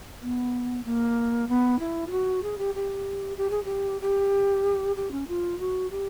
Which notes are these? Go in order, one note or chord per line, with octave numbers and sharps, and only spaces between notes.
B3
A#3
B3
E4
F4
F#4
G#4
G4
G4
G4
G#4
G4
G4
G4
C#4
F4
F#4
G4